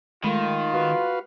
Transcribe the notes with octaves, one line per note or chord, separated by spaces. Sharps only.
D#3 G#3 A3 F4 B5
F#4 B4 F5